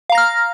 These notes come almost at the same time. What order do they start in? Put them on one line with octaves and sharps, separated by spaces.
F5 A#5 A#6 F6